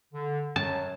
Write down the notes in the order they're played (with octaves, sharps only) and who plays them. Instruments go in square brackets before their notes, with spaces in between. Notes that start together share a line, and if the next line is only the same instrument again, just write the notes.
[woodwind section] D3
[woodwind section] F#2 F#3 [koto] A5